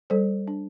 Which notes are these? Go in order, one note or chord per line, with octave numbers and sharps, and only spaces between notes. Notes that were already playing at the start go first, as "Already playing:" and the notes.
G3 A4 C5
D4